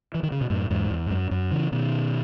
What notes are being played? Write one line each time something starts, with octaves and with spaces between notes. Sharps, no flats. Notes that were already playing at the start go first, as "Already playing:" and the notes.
E3
D#3
C#3
B2
F#2 A2
E2 G#2
E2
G#2
F#2
F#2
C#3 E3
B2 D#3